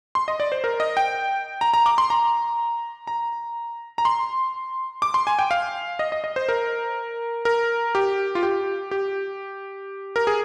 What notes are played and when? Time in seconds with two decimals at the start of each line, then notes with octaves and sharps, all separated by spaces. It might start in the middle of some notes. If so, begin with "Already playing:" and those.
0.15 C6
0.28 D#5
0.40 D5
0.52 C5
0.64 A#4
0.80 D#5
0.97 G5
1.61 A#5
1.74 A#5
1.86 D6
1.98 C6
2.10 A#5
3.07 A#5
3.98 A#5
4.05 C6
5.02 D6
5.14 C6
5.27 G#5
5.39 G5
5.51 F5
5.99 D#5
6.12 D#5
6.24 D#5
6.36 C5
6.49 A#4
7.45 A#4
7.95 G4
8.35 F4
8.43 G4
8.91 G4
10.16 A#4
10.27 G#4